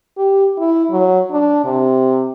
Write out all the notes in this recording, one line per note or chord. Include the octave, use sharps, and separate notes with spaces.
G4
E4
F#3
D4
C3